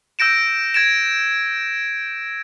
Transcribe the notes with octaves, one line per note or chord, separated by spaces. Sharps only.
E6 G6 A#6 D7 E7
G#6 A6 D7 E7